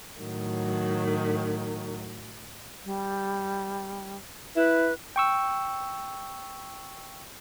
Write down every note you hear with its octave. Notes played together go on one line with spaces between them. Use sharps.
A2 D#3 F#3
G3
E4 B4
G5 C#6 E6